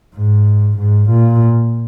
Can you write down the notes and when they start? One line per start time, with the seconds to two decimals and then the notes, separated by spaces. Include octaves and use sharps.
0.16 G#2
0.79 G#2
1.10 A#2